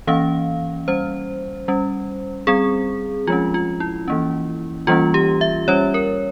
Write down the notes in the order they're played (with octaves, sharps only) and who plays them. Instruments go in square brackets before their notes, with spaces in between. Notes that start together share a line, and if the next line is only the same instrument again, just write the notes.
[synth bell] E3 A#3 C#4 F5
G3 C#4 C5
G3 C#4
G3 C4 G#4
F3 G#3 C#4 F4
F4
E4
E3 A#3 C#4
E3 G3 A#3 C#4 F4
G4
E5
G3 C#4 C#5
A#4